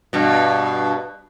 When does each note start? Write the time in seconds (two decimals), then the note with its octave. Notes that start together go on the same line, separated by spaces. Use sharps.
0.13 G2 B2